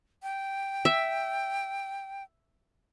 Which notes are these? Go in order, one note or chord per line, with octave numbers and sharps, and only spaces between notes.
G5
E5